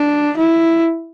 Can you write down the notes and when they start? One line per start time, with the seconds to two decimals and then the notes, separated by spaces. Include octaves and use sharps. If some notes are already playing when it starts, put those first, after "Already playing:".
Already playing: D4
0.37 E4